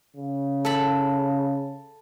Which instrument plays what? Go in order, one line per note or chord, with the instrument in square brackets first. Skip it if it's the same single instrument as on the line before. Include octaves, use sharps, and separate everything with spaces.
[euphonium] C#3
[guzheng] A4 B5